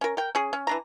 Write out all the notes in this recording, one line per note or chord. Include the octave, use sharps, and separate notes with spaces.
C#4 A#4
A#4 G5
C#4 G#4
C#4
E3 D4 A#5